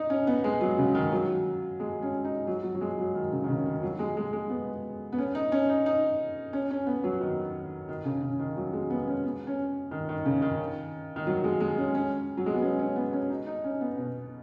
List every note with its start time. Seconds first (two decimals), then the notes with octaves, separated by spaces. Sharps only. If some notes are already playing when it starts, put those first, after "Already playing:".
Already playing: D#4
0.10 C#4
0.27 B3
0.44 G#3
0.61 F#3
0.78 C#3
0.95 D#3
1.12 F#3
1.80 G#3
2.02 C#4
2.24 D#4
2.47 F#3
2.63 F#3
2.75 F#3
2.81 G#3
2.99 F#3
3.15 D#3
3.32 C#3
3.44 D#3
3.48 C#3
3.66 D#3
3.83 F#3
3.99 G#3
4.17 G#3
4.33 G#3
4.50 B3
5.12 B3
5.18 C#4
5.35 D#4
5.52 C#4
5.69 D#4
5.86 D#4
6.53 C#4
6.71 C#4
6.86 B3
7.04 F#3
7.21 D#3
7.89 D#3
8.05 C#3
8.23 C#3
8.40 D#3
8.57 F#3
8.73 G#3
8.90 B3
9.07 C#4
9.24 B3
9.47 C#4
9.91 D#3
10.09 D#3
10.25 C#3
10.42 D#3
11.16 D#3
11.27 F#3
11.44 G#3
11.60 G#3
11.78 C#4
11.95 C#4
12.37 F#3
12.46 G#3
12.54 B3
12.62 C#4
12.79 C#4
12.96 B3
13.13 C#4
13.30 D#4
13.46 D#4
13.64 C#4
13.81 B3
13.98 B2